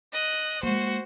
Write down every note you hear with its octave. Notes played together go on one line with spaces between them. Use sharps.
D#5 F#6
G#3 A#3 F#4 C5